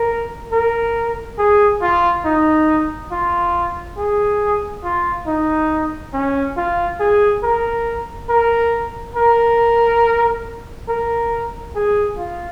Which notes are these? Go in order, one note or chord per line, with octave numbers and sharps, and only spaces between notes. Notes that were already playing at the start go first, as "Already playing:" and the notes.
Already playing: A#4
A#4
G#4
F4
D#4
F4
G#4
F4
D#4
C#4
F4
G#4
A#4
A#4
A#4
A#4
G#4
F4